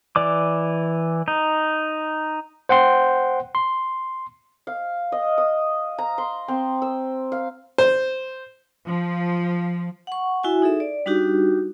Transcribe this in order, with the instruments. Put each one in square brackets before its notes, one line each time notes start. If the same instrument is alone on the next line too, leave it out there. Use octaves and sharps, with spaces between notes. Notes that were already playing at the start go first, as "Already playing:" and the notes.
[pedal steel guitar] E3 D5 D6
D#4
[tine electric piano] C5 F#5 G5 C6
C6
[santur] F5
D#5
D#6
A#5
C6
C4
E6
F5
[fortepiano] C5
[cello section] F3
[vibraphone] F#5 C#6
E4 F#4 E5 G#5
D#4 G#4 A4 E5
D5
G3 D4 D#4 F#4 G4